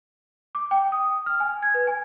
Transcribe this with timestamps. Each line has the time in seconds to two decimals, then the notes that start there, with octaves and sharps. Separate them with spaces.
0.55 D6
0.71 G5
0.92 D#6
1.26 F6
1.40 G#5
1.62 G#6
1.74 B4
1.87 G#5